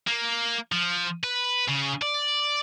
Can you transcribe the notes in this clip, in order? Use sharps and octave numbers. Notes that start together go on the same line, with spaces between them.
A#3
F3
B4
C#3
D5